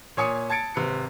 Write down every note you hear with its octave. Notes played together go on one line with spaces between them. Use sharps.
A#2 C#5 G#5 D#6 C#7
A5 G#6 A6 C#7 D7
G#1 C3 B4 C#7